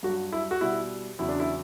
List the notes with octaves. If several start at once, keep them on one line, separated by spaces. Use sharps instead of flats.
G2 F#3 F#4
E4
F#4
B2 G3 E4
E2 C#3 F#3 E4
D4
E4